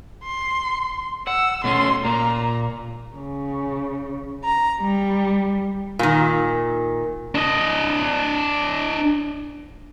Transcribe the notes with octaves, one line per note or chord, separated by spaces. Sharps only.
C6
F#5 E6
B2 A3 C#4 C6
A#2 A#3 A#5
C#3
A#5
G3
A#2 D#3
D4 D#5